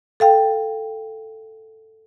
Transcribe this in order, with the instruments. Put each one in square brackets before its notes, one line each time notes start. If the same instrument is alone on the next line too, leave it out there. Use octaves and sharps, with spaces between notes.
[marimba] A4 F5 G5